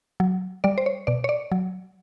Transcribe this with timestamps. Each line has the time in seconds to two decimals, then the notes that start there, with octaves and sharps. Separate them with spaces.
0.20 F#3
0.64 G3 D5
0.78 C5
0.86 C#5
1.07 B2 D5
1.24 C#5
1.29 D5
1.52 F#3